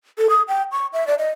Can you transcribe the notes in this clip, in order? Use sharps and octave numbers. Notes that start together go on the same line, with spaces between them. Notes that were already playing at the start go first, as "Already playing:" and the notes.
A4
D#6
G5
C#6
E5
D5
D#5